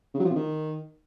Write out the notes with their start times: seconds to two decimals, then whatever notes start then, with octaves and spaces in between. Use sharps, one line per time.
0.14 C#3
0.20 F#3
0.25 F3
0.30 C3
0.36 D#3